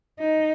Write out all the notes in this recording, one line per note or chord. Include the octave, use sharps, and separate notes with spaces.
D#4